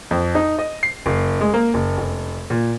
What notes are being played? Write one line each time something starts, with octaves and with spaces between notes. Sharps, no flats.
F2
D#4
D#5
C7
F#1
G#3
A#3
F#1
F1
A#2